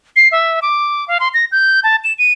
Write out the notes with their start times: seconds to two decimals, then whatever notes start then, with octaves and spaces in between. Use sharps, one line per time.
0.16 C7
0.32 E5
0.62 D6
1.08 F5
1.20 C6
1.34 A#6
1.52 G6
1.84 A5
2.04 E7
2.19 D#7